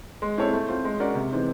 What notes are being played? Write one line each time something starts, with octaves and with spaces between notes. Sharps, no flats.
G#3
C4 E4 A4 C#5
A3
C4 F4
G#3
C#4 F#4 A#4 D5
C3
E3 G#3 C4 D#4